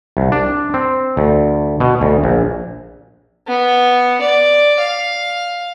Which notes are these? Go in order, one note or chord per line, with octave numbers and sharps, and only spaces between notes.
C2
D4
C4
D2
B2
D2
A#1
B3
D5
F5